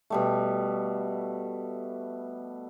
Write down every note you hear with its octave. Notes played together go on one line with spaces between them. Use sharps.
B2 G3 A3